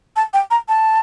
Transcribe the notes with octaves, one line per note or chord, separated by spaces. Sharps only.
A5
G5
A#5
A5